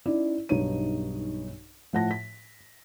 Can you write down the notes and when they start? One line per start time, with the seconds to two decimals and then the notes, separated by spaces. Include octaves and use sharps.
0.06 C#4 D#4 E4 D5
0.49 B1 G2 D#4 C#5 D#7
1.93 A2 F3 F#5 A5 A#6
2.11 B6